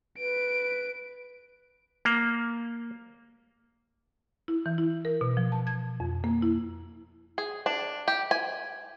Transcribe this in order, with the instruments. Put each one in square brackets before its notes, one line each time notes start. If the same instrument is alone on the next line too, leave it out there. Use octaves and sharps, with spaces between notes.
[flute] B4 [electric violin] D7
[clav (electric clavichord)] A#3
[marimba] E4
E3
E4
A#4
B2
F3
A5
G#6
F2
A#3
E4
[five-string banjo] G#4
D4
G4
G#5